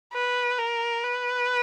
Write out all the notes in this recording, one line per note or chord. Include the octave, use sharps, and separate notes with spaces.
B4
A#4
B4